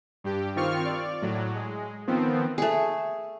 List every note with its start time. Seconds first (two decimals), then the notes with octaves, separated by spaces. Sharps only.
0.24 G2 G4
0.56 D#3 C4 F4 C#6 F6
0.85 D5
1.22 A2 F#3
1.55 G#3
2.07 D#3 F3 B3 C4
2.58 A3 G#4